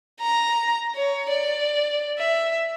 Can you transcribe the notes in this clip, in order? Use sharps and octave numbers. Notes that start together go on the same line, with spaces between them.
A#5
C#5
D5
E5